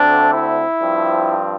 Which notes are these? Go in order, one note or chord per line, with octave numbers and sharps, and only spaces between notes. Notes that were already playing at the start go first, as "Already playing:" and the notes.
Already playing: D2 D3 A3 C4 D4
E4
G2 F3 C4